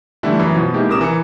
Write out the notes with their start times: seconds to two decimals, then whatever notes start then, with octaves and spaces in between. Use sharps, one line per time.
0.23 D3 E3 G3 A3 D4 E4
0.39 F#2 E3
0.55 B2 F3
0.74 G#3 A#3 D#4 E4 G4
0.89 A#1 C3 A#4 D6 D#6 E7
1.01 E3 G#5 A#5 C#7